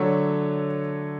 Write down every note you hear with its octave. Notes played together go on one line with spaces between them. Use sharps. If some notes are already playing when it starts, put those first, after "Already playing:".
Already playing: D3 F#3 A3 A4 C#5